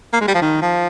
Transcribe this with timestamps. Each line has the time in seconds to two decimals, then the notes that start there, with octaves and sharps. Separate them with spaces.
0.13 A#3
0.21 G#3
0.28 G3
0.35 F3
0.42 D#3
0.62 F3